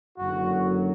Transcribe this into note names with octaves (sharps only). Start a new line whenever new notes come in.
F#1 F#2 D3 F#3 F#4